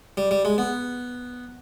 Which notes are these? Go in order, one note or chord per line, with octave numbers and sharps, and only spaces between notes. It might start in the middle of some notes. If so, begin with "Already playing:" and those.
G3
G3
G#3
B3